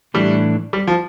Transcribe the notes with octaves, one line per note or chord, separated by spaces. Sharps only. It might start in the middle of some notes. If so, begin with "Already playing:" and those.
A2 E3 G3 A3 D4
G3
F3